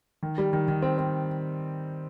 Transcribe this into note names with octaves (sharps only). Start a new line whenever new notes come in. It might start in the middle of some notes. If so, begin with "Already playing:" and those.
D#3
G3
D#3
D#3
C4
C4